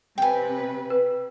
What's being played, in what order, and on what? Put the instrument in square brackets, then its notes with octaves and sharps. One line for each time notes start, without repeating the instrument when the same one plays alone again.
[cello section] C3 B4 [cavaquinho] G5 G#5
[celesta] B4